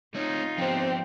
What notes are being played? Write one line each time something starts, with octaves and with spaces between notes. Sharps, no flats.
A3 C4 D#4 F4 C#5
F3 B3 C4 G4